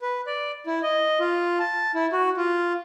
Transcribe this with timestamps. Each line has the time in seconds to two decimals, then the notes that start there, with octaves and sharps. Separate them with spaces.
0.02 B4
0.27 D5
0.67 E4
0.83 D#5
1.20 F4
1.60 A5
1.95 E4
2.13 F#4
2.37 F4